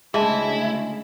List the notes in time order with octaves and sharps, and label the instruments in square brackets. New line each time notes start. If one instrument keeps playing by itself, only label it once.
[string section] D2 C#3 [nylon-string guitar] G#3 [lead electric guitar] E4 [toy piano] G#4 E5 A5